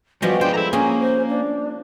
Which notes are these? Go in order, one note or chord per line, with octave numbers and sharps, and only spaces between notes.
F3 G3 G#3 B3 F#4
B3 D4 C5 G5
E4 A4 A#5
A#3 C#4 G#4 G#5
C5
D4